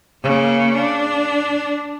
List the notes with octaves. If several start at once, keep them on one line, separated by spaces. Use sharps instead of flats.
C#3 A#3
D4